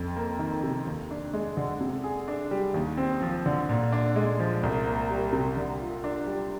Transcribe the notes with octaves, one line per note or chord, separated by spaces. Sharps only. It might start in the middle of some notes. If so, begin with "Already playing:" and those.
Already playing: F2
A#3
D#3
C3
D#2
D4
G#3
D3
C3
G#4
D4
G3
D#2
C4
F3
D3
A#2
D4
G#3
F3
C2
A#3
G3
C3
D3
F4
D4
G3